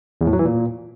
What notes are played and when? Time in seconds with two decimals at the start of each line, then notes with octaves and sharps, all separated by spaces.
0.21 E2
0.27 A2
0.33 F#3
0.39 E3
0.45 A#2